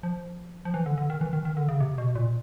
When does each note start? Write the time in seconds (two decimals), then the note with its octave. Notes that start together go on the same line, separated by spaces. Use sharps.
0.03 F3
0.65 F3
0.74 E3
0.86 D3
0.98 D3
1.10 D#3
1.21 E3
1.33 D#3
1.45 D#3
1.57 D3
1.69 C#3
1.80 C3
1.98 B2
2.15 A#2